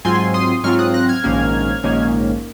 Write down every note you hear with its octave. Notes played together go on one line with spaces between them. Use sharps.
G#2 F#3 C4 F4 G#5 C6
C6 D#6
G#2 F#3 C4 F4 C#6 F6
D#6 F#6
F#6 A#6
F6 G#6
A#1 G#2 D#3 A#3 C#4
A#1 G#2 D#3 A#3 C#4